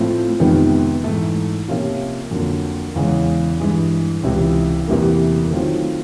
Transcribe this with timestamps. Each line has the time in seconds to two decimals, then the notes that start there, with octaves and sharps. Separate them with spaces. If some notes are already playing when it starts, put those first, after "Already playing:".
Already playing: A2 F3 A3 C4 F4
0.40 F2 C3 D#3 G#3 B3
1.04 G#2 E3 A3
1.68 C3 F3 A#3 C#4 F4
2.31 F2 D3 F#3 A#3
2.96 E2 C#3 E3 G#3
3.60 G2 E3 G#3
4.23 C#2 C3 E3
4.87 E2 C3 E3 G3 A#3
5.51 D#3 F#3 A3 C4 F4